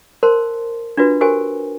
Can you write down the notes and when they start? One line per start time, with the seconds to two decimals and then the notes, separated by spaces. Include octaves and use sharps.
0.23 A#4 C5 A5 C6
0.97 D4 F4 F#4 B4
1.21 F#4 G4 A#4 C5 G#5